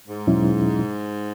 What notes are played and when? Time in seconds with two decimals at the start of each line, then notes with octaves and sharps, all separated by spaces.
0.08 G#2
0.27 E2 B2 F#3 C#4 E4